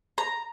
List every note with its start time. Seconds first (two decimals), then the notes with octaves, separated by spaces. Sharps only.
0.18 A#5